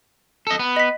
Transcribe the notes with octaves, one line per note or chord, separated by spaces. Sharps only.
A4 D#5
B3
D#5 B6